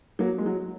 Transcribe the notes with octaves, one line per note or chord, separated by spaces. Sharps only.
F#3 A#3
G#3
F#3